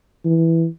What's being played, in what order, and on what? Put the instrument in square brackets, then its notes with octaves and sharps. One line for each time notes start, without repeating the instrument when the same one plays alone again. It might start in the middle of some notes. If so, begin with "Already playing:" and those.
[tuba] E3